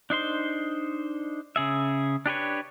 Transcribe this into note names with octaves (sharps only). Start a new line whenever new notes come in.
D4 D#4 C5 C6
C#3 G#4 E5
D4 G4 B4 C#5